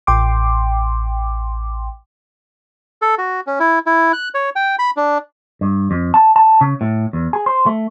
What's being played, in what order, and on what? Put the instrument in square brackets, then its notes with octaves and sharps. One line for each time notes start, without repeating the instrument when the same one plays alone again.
[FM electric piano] A1 G5 C6 D6
[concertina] A4
F#4
C#4
E4
E4
F#6
C#5
G5
B5
D4
[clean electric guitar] G2
F2
A5
A5
C#3
A2
E2
G#4
C5
A3